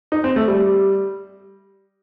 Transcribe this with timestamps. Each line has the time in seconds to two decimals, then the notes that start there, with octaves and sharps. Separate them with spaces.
0.12 D#4
0.24 C4
0.36 A3
0.48 G3